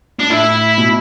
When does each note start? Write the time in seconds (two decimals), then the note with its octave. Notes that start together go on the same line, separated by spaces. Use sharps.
0.19 D4
0.30 A2 E4
0.78 B2